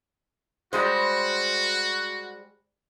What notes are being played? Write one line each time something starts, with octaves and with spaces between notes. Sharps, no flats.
G3 G#3 F#4 C5